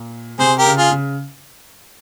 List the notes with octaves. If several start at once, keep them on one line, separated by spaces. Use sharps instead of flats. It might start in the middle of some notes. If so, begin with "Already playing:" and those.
Already playing: A#2
C3 G#4 C5
G4 A#4
C#3
F4 G#4
C#3